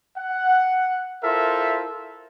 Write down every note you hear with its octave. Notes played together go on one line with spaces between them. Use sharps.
F#5
E4 F4 A4 A#4 C5 E5